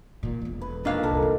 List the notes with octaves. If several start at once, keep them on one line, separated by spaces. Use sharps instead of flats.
A#2 D#3
E1 F2
B4
A#2 D#3 D4 F5
C2 F#2 A#3 A4
F2